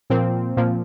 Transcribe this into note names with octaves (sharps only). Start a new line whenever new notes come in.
A#2 F3 A#3 C4
A#2 F3 A#3